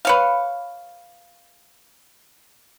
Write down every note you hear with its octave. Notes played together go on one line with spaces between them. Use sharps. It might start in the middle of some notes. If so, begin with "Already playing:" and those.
B4 C#5 F5